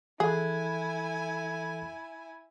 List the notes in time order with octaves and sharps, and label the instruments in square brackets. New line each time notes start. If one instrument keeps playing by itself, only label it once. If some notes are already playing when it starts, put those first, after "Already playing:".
[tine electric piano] E3 A4 F#6 [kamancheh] E4 G#5 [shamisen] G#4